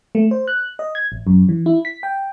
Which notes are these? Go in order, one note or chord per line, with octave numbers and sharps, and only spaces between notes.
A3
C5
F#6
D#5
G#6
A1
F#2
E3
E4
B6
G5